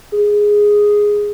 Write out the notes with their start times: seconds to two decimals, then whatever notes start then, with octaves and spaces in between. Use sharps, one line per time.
0.12 G#4